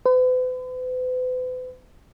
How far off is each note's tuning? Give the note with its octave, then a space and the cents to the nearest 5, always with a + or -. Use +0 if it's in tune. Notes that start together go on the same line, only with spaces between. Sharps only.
B4 +45